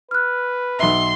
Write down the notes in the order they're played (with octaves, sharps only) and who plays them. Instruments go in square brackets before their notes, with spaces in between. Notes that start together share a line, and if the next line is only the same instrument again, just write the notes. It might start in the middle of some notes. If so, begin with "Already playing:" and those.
[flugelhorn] B4 [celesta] F6 F#6
[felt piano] B1 E5 [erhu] C6